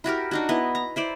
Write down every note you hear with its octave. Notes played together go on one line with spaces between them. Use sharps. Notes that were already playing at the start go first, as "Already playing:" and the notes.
E4 F#4 G4 A#4
D4 D#4 F#4
B3 E4 D#5
A#5
E4 C5 D5